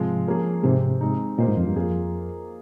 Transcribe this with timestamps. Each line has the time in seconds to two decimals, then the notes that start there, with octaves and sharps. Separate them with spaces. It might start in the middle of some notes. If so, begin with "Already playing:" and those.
Already playing: G#2 C3 F3 G#3 C4 F4
0.27 F3 A#3 C#4 G#4
0.64 G#2 C3 G#3 C4 G4
1.01 G#3 C4 D#4
1.38 A#2 A#3 F4 C5 D#5
1.48 G#2
1.57 F2
1.67 G2
1.76 F2 A#3 F4 G#4